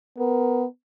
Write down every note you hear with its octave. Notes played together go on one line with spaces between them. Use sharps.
B3 A#4